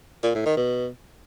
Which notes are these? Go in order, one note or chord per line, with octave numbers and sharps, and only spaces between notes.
A#2
A2
D#3
B2